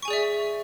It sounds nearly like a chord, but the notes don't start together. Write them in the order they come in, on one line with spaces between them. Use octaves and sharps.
C#6 G#5 G#4 D5 E5